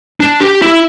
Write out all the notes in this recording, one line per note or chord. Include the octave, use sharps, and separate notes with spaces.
D4
G4
E4